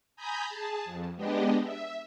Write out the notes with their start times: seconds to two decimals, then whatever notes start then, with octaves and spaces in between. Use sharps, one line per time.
0.16 G#5 A#5 B5 D#6 G6
0.46 G#4 A5
0.85 F2
1.16 G#3 B3 D4 G4 D#5
1.62 E5